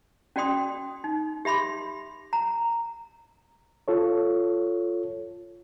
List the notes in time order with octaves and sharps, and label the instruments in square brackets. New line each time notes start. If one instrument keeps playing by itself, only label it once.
[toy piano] C#4 F#4 D5 G5 C6 D#6
D#4
G4 E5 B5 C6 D6
A#5
[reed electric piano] F4 A4 C#5